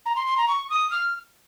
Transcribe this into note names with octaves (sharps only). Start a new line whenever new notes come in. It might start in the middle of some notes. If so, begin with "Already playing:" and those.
A#5
C6
C6
A#5
C#6
D#6
F6